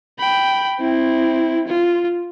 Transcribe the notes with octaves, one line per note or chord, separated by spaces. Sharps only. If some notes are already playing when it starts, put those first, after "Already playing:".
G5 B5
C4 E4
F4